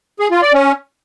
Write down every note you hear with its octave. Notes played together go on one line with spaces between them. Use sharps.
G#4
F4
D5
C#4